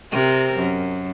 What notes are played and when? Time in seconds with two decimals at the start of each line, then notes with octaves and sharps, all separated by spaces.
0.12 C3 C4 A#4
0.58 F#2